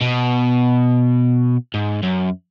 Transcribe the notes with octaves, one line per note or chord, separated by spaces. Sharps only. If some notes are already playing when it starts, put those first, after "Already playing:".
B2
G#2
F#2